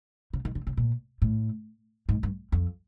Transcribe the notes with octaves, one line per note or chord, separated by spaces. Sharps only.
C#3
D#3
D3
C#3
A#2
A2
G#2
G2
F2